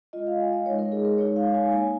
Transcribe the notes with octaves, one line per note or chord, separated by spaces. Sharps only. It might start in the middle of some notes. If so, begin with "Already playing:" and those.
G#3 F4 D#5
F5
G#5
D#5
G#3 D#4 C#5
A#4
G#4
A#4
G#3 D#4 C#5
F5
G#5
A#3 D#4 G#5